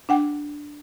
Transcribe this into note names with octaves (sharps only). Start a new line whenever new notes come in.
D4 F#5 G5